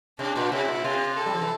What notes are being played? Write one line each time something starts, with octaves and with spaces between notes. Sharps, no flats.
C3 D4
A#2
C3 E4
A#2
C3 F4
A4
G3
F3
E3